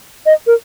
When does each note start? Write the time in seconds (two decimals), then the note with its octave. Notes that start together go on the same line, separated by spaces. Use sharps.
0.26 D#5
0.47 A#4